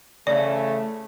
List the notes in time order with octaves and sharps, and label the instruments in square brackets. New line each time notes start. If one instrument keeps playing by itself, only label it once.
[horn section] C#3 E3 A3 [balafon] D5